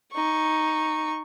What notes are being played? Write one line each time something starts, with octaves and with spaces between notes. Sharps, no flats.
D#4 C#6